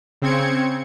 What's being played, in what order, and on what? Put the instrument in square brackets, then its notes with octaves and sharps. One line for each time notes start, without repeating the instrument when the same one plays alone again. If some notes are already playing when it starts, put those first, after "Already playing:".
[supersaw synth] C#3 C4 G#6 C#7